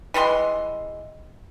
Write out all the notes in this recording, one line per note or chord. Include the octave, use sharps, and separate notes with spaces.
E3 G3 G#3 C6